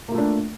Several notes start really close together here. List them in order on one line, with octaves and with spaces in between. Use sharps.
A#3 F4 A3 D4